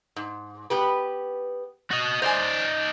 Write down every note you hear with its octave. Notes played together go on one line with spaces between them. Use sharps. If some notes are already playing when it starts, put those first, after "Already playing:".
G#2
B3 G4 B4
F#4 D#5
D#4 C5 D5 D#5 G#5